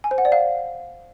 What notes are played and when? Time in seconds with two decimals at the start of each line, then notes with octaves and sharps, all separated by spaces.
0.04 G#5
0.11 C5
0.18 F#5
0.25 D5
0.32 F5